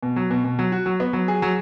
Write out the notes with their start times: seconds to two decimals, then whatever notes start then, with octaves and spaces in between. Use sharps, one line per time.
0.03 B2
0.16 F#3
0.30 B2
0.44 B2
0.59 F#3
0.72 F#4
0.86 F#3
1.00 B3
1.13 F#3
1.28 G#4
1.42 F#3